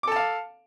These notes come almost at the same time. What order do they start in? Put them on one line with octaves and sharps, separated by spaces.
D6 A4 A5 F5